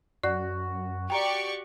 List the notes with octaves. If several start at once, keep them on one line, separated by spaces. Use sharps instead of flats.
F#2 F#4 D5
G4 D5 G5 A#5 C#6